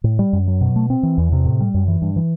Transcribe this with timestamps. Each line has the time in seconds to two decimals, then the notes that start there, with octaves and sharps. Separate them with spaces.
0.04 A2
0.19 G3
0.33 F#2
0.47 F#3
0.61 B2
0.76 A3
0.90 C4
1.03 E3
1.18 E2
1.32 C3
1.45 A2
1.60 G3
1.74 F#2
1.88 E3
2.02 G2
2.16 E3